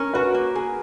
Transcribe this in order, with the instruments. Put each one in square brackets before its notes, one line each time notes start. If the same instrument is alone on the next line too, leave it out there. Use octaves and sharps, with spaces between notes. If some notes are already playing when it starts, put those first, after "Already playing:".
Already playing: [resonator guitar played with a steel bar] C#4 [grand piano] A#4
[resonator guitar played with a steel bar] F#4 [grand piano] B4
[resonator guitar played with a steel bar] A#3
G#4